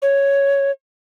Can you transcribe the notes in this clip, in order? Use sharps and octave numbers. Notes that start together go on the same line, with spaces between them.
C#5